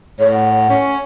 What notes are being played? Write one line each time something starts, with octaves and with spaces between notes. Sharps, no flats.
A2 C#5
F#5
C#4